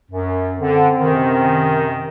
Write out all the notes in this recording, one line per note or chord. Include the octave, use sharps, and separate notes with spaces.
F#2
D3 C4
F#2 C3 D#3